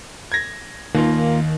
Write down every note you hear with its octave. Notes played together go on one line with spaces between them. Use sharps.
G#6 A#6
D#2 D#3 A#3 F4